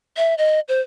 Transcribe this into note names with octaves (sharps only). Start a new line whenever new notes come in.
E5
D#5
C5